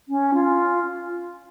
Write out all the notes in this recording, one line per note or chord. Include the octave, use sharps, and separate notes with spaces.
C#4
F4